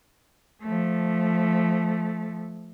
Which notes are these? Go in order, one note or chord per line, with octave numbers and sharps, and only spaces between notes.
F3 A3